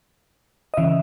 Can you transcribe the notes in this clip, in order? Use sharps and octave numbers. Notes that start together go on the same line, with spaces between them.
D#5
C#3 E3 E5